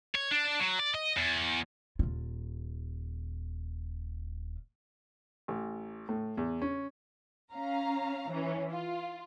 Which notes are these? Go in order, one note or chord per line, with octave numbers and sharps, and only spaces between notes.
C#5
D4
F#3
D5
D#5
E2
D#1 F4
A1
A2
E2
C#4
C#4 F5 A#5
E3 C#4
F4